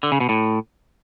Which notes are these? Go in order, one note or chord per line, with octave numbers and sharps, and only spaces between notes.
D3
C#3
B2
A2